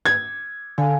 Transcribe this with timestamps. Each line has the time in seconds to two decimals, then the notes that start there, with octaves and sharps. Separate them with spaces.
0.05 G#6
0.78 D3 F5 G#5